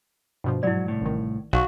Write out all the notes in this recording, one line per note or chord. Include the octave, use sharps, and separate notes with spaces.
G2 B2 F3
G#2 F#3 E4 D5
C2 A2
A1 D#3
B1 F#4 F5 C#6